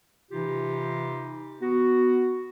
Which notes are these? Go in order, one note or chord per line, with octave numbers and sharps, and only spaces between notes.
C3 E3 D#4 F4 G4
B3 F#4